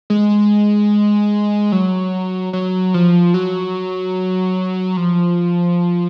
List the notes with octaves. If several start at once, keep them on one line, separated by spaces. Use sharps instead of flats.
G#3
F#3
F#3
F3
F#3
F3